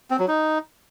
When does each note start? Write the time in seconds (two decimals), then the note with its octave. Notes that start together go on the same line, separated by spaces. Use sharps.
0.10 C4
0.19 F#3
0.28 D#4